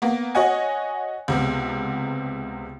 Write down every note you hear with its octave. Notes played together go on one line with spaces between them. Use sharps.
A#3 B3
F#4 C#5 D#5 F#5 G#5
C#2 C3 B3